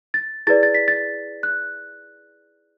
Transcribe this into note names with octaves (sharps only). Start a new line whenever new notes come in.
A6
E4 G#4 B4 D5 A6
A6
B6
A6
F#6